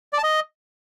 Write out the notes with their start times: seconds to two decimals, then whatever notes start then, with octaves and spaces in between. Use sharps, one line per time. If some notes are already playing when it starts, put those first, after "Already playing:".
0.13 D5
0.18 A5
0.23 D#5